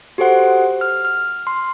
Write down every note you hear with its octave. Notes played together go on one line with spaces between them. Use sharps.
F#4 G4 A4 C5 F#5
F6
F6
C6